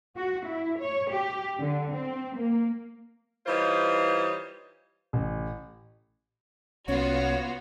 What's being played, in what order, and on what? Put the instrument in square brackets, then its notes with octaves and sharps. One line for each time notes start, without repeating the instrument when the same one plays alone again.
[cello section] F#4
E4
C#5
G4
D3
C4
A#3
[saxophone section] E3 G3 D#4 F4 C5 C#5
[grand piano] A1
[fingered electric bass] C2 C#4 [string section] B3 F4 F#4 [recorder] C#5